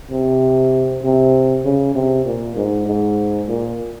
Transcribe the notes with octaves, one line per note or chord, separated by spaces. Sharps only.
C3
C3
C#3
C3
A#2
G#2
G#2
A#2